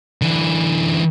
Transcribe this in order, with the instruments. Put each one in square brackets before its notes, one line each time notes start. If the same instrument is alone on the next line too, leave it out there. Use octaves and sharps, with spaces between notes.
[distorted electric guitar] D3 E3